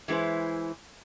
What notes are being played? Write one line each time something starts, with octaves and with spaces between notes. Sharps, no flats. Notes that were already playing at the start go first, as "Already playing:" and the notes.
E3 G#3 E4 B4 C5